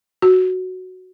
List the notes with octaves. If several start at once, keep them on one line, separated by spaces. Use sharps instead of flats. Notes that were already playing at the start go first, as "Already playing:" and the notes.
F#4